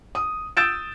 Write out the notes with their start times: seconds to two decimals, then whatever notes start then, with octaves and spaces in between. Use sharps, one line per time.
0.15 D#6
0.57 D#6 E6 G6 A6 D7 E7